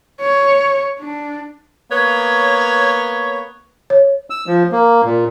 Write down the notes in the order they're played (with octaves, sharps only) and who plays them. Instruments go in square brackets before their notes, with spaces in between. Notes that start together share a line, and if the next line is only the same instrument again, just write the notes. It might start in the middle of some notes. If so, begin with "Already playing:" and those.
[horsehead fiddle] C#5
D4
[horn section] A#3 B3 C#5
[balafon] C#5
[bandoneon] E6
F3
A#3
A#2